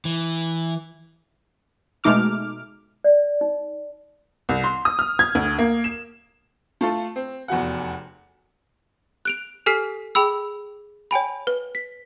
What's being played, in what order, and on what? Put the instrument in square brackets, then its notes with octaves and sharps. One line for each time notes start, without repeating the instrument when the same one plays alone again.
[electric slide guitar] E3
[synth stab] B2 G#3 A3 D#4 D6 F6
[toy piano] D5
D#4
[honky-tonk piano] C2
C6
D#6
F6
G#6
D2
A#3
E7
A3 F4 A4
C4
F1 E2 F#4 F#5
[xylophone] F#6 D7 F7
G4 A4 G#5 F6 B6 C7
G#4 G5 B5 E6
C#5 G5 G#5 B5
B4
B6